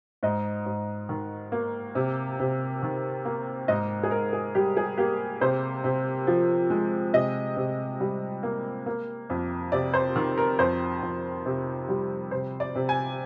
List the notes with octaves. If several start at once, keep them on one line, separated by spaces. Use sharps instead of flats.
G#2 D#5
G#2
D#3
A#3
C3
C3
D#3
A#3
G#2 D#5
G#4
G#2 A#4
G#4
G3 G4
G#4
A#3 G4
C3 C5
C3
F3
G#3
C3 D#5
C3
G3
A#3
A#3
F2
C3 D5
C5
D#3
A#4
F2 C5
F2
C3
G3
C3 C5
D5
C3
G#5